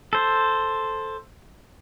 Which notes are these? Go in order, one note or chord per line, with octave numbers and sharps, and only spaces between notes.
A4 C5